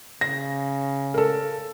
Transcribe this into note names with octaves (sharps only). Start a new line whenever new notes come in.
C#3 A#6
A4 A#4